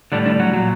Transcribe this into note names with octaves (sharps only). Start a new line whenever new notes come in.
A2 D3 G3 D4
D3 D4
F#3 F#4
A#2 F#3